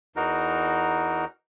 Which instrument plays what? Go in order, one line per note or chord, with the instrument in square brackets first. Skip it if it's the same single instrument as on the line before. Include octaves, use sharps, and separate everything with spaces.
[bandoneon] E2 E3 D#4 F#4 A#4